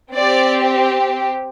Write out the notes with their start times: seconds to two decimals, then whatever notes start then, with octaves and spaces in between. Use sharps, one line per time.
0.14 C4 D5
0.19 G4